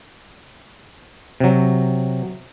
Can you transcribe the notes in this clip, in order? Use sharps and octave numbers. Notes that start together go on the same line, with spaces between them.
C3 F#3